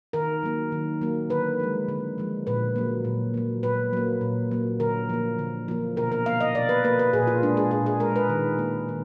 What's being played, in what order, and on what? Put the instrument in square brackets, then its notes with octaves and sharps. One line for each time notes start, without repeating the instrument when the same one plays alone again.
[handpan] D#3 A#4
F#3 A#3
D#3
F#3 A#3
D3 B4
F3 G#3
D3
F3 G#3
A#2 B4
F#3 A#3
A#2
F#3 A#3
A#2 B4
F#3 A#3
A#2
F#3 A#3
D3 A#4
F3 A#3
D3
F3 A#3
B2 A#4
A#4
A#3 F5
D#5
B2 D5
B4
A#3 B4
B4
A#2 G#4
F4
G#3 D4
G#4
A#2 G#4
G#4
G#3 A#4
B4
D#3
A#3
D#3